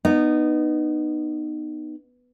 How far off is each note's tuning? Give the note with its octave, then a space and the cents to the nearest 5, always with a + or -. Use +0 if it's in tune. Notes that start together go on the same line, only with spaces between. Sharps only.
B3 +0 D#4 -25